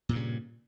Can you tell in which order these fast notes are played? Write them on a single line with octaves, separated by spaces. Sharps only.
A#2 G2 C#3